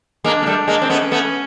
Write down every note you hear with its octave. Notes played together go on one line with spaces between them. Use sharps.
G#3 A#3 D4
A#3
G3 A3
G#3 A#3
C4
A3 B3 C#4
A3 B3